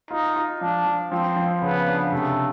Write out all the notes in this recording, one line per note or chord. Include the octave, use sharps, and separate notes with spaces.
D#4 F4
F4
F3 D4
F3
F3 C4
F3
C#3 B3
D4
C3 A3